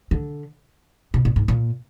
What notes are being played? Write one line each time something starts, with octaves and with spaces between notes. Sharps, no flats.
D3
B2
A#2
G#2
A#2